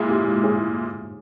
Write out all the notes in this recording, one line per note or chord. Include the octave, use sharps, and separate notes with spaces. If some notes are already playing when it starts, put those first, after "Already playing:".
Already playing: A#2 G#3 E4 G#4
G4
G#4